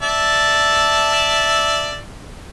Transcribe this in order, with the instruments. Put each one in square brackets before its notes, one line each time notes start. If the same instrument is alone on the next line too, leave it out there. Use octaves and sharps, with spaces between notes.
[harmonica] D5 E5 A5